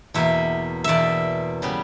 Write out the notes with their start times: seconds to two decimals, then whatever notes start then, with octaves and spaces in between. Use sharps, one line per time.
0.14 E2 B2 A#3 E5
0.84 E2 B2 A#3 D5 E5
1.62 C#3 G3 B3